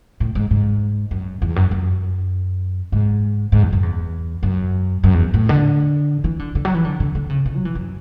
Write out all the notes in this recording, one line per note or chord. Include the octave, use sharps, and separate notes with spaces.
A2
G#2
G#2
F#2
E2
F#2
F#2
G#2
G#2
E2
F#2
E2
F#2
F#2
E2
A2
D3
E3
D3
D3
F#3
E3
D3
D3
D3
C#3
B2
F#3
E3
F#2